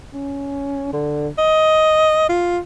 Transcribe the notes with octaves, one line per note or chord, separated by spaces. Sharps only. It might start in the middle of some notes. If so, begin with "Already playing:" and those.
C#4
D3
D#5
F4